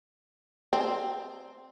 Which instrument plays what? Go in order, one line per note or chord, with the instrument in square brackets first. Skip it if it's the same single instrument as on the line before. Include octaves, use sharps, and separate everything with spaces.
[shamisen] C4